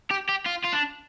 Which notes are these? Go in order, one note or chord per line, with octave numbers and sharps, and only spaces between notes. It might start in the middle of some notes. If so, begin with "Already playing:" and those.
G4
G4
F4
F4
D4